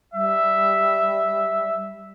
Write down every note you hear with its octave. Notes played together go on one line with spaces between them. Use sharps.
G3 E5